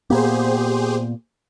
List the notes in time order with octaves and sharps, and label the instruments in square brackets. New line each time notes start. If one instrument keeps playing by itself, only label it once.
[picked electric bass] A#2 A#3 B3 [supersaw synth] G4 G#4 C5